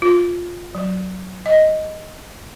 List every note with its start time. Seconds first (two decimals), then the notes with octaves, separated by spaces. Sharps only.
0.02 F4
0.75 F#3
1.46 D#5